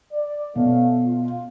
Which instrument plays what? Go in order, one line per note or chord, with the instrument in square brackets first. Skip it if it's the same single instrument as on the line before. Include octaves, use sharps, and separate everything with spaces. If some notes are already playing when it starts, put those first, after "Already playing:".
[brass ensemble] D5
[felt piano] B2 [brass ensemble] A3 C#4 F5
[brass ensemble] F4